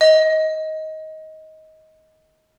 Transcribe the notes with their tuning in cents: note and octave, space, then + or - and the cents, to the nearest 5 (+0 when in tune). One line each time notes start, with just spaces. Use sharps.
D#5 +15